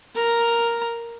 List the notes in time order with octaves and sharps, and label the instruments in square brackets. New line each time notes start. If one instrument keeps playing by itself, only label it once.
[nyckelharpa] A#4 A#5